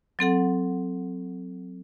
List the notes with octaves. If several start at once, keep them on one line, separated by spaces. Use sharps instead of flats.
F#3 C4 A4 F#5